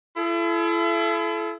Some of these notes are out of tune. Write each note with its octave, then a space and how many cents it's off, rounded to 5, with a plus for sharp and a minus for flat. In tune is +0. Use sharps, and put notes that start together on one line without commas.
E4 +40 A4 -30